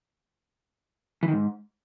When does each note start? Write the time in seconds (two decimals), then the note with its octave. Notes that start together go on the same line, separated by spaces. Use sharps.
1.23 E3
1.28 D#3
1.33 G#2